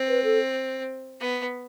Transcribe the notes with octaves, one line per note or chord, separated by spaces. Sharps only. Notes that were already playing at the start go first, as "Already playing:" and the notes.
Already playing: C4
B4
A4
B3